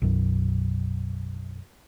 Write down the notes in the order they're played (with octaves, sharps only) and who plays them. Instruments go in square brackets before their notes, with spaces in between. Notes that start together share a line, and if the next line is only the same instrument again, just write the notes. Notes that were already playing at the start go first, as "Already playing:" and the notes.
[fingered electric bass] B1 F#2